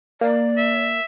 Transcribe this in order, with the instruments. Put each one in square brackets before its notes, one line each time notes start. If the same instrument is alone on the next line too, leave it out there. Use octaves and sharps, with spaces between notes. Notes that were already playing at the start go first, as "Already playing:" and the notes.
[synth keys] A#3 [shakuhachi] D5
[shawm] E5